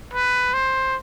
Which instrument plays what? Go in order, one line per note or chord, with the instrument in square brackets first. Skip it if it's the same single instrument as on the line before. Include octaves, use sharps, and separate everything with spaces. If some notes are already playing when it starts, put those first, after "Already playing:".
[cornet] B4
C5